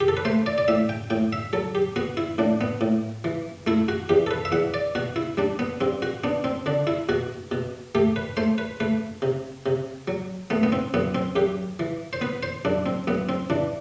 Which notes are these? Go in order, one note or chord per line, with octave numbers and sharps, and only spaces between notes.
G4
A4
B4
A3 C5
D5
D5
A2 E5
G5
A2 G5
E5
F#3 A4
G4
B3 F#4
E4
A2 D4
B3
A2
E3
A3 E4
F#4
E2 G4
A4
B4
E5
E2 F#5
D5
B2 F#4
E4
G3 D4
B3
G2 C4
F#4
B3 D4
C4
D3 D4
E4
B2 F#4
B2
A3 G4
B4
A3 C5
B4
A3 B4
C3
C3
F#3
A3 B3
B3
C4
F#2 B3
C4
F#2 G4
E3
C5
B3 B4
C5
F#2 D4
C4
F#2 B3
C4
E3 D4